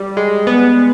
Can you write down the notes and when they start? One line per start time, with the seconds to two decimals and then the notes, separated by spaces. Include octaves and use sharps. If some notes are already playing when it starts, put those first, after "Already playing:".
Already playing: G3
0.17 G#3
0.47 B3